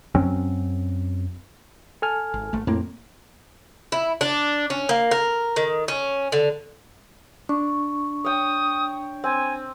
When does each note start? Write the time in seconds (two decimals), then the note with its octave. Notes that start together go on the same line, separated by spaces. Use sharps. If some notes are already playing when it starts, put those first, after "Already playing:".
0.15 F#2 F#3 C4 C#4
2.02 A4 G#5 F6
2.34 G#1
2.53 G#1 A3
2.67 F2 A2 A#3 C4
3.92 E4
4.21 D4
4.70 C#4
4.89 A#3
5.11 A#4
5.56 D#3
5.88 C#4
6.32 D3
7.49 D4 C#6
8.24 C#5 G5 D#6
9.24 C4 G#5